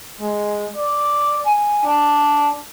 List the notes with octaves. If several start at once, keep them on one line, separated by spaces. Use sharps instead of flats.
G#3
D5
G#5
D4